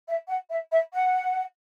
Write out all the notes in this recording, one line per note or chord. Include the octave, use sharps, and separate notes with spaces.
E5
F#5
E5
E5
F#5